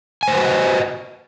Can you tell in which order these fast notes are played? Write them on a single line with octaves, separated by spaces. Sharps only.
G#5 C5 B4 F#4 D#5